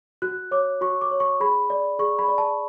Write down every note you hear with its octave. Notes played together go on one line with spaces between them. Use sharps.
F#4 F#6
C#5 D6
F#4 C#6
D6
C#5
C#6
G#4 B5
D5
G#4 C#6
B5
D5
A5